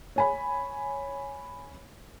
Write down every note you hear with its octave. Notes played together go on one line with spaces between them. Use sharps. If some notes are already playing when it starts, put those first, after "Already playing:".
C#5 G#5 B5